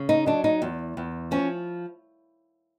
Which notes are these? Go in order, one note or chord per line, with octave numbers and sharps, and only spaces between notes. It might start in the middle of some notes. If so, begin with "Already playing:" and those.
Already playing: C#3
D#4
F#3 D4
D#4
E2
E2
F3 C#4